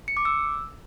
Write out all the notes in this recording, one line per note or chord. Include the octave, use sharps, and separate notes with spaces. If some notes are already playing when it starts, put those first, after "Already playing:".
C#7
D6
E6